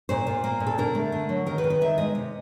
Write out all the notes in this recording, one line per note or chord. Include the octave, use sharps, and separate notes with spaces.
A#2 C5
A#2
A#3
A#2
A4
D3 A#4
A3
D3
F#3
D#3 A#4
B4
D#3
B4
D#3 E5
G#3 D#5
C3